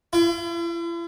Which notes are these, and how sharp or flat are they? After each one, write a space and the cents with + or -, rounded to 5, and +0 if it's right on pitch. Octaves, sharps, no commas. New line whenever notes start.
E4 +45